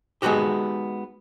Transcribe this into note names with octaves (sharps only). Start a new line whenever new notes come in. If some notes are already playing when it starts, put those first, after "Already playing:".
G#3 B3 D#4 F#4 G4